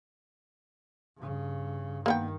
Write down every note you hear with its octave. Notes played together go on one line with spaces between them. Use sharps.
G2 C#3
G2 D#3 A#3 B3 G5